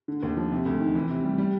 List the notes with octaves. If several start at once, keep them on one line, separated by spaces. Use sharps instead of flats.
D3
D#2
F3
C3
D2
D#3
E3
C3
G3
G3